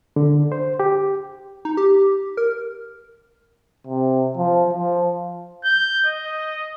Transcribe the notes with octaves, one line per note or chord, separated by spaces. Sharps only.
D3
C5
G4
D#4
G4
A#4
C3
F3
F3
G6
D#5